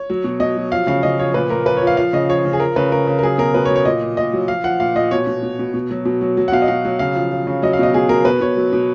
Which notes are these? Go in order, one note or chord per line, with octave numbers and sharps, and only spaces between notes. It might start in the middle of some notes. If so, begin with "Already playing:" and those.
Already playing: C#5
F#3
B2
B2 D#5
F#3
F3 F5
C#3 F5
C#3 D#5
F3 C#5
A#2 B4
A#2 A#4
F3 B4
C#5
F3
F5
F3 F5
C#3 D#5
F3 C#5
C#3
G#4
F3 A#4
C#3 B4
C#3 A#4
C#3
A#4
F#3 G#4
B2 A#4
B2 B4
C#5
F#3
C#5
A#2 D#5
A#2
A#2 D#5
F#3
F3 F5
F3 F#5
A#2 F5
A#2 D#5
B2 C#5
B2
B2
B2
B2
F#3
B2
F#3
F#3
F#5
B2 F5
D#5
B2 F5
F#3
C#3 F5
F3
F3
C#3
F#3 D#5
F5
B2 D#5
B2 G#4
B2 A#4
B2 B4
B2 C#5
F#3
B2